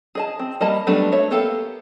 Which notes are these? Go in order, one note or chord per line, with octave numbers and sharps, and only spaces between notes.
G#4 D#5 A5
C4
G3 A#3 D#5 A5 B5
F#3 G3 A3 B3 D4
A3 C#5 E5
A#3 B3 G4 A4 F5